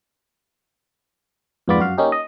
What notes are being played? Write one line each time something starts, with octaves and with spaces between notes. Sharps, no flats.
F2 G#2 B3 F4 D5 B5
F#2 F#4 F5
A#3 C#4 D#4 G4
D#5